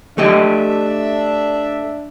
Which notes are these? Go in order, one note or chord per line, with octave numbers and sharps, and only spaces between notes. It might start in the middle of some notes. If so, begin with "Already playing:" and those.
A3 D4 G4 D#5 E5